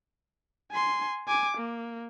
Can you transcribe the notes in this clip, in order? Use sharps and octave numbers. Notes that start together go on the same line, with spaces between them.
G#5 C6
G#5 D6
A#3